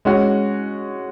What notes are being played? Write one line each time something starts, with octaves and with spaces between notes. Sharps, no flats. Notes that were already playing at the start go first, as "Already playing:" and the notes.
G#3 C#4 F#4